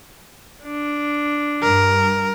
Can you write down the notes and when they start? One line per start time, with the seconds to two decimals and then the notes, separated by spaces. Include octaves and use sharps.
0.63 D4
1.62 G2 A#4